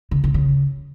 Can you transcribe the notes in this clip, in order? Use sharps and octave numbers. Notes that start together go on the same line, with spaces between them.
C#3
C#3
C#3